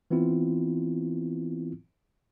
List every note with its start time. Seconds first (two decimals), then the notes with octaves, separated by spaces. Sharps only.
0.11 E3 B3 C4 E4 F4